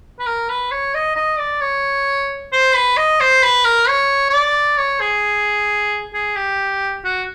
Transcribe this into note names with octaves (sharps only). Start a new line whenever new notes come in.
B4
A#4
B4
C#5
D#5
D#5
D5
C#5
C5
B4
D#5
C5
B4
A#4
C#5
C#5
D5
C#5
G#4
G#4
G4
F#4